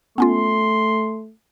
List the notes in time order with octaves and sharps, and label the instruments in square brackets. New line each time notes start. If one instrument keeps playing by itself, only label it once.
[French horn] A3 [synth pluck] B3 C#4 F4 [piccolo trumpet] C6